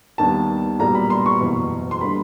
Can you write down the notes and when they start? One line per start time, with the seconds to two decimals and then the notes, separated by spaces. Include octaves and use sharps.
0.18 D#2 D#3 G3 B3 A5
0.79 B1 A#2 G3 B3 A#5
0.95 B5
1.10 C6
1.26 C#6
1.41 F#1 E2 B2
1.91 C6
2.01 D3 G3 A#3 B5